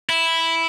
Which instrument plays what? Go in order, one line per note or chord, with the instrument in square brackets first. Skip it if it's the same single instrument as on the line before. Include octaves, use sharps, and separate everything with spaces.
[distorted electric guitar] E4